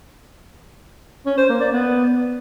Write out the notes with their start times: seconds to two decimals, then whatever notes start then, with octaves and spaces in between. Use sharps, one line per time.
1.26 C#4
1.38 C5
1.49 A#3
1.61 D5
1.72 B3